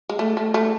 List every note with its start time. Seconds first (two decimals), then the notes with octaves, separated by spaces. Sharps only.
0.09 G#3
0.19 A3
0.37 A3
0.54 A3